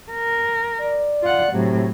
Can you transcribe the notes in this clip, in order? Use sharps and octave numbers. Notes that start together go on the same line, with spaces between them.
A#4
D5
F4 F#5
A2 C3 F#3